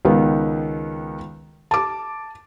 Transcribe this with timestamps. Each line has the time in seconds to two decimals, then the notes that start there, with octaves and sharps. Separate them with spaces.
0.05 C#2 D#3 B3
1.71 A5 D6